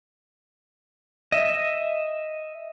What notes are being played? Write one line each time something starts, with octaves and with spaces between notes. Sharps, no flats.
D#5 E5